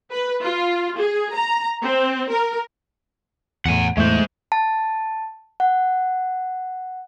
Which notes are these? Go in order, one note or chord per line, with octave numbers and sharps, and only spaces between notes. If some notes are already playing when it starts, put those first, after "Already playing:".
B4
F4
G#4
A#5
C4
A#4
E2 A2 F#5 G#5
E2 A2 G#3 A3 C5
A5
F#5